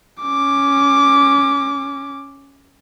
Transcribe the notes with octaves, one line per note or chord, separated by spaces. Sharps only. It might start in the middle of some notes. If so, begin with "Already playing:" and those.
C#4 D6